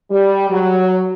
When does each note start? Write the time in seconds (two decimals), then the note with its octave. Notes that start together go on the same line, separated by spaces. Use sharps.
0.10 G3
0.50 F#3